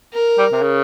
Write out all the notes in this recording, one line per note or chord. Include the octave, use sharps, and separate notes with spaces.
A#4
G3
C3
C#3